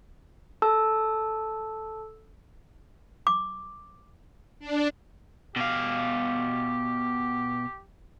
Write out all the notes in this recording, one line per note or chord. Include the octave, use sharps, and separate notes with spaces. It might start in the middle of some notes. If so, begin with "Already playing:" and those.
A4 A5 E6
D6
D4
B2 G4 F5